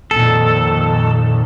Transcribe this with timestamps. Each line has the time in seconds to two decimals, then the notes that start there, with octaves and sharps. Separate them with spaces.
0.11 F2 A#2 D#3 A4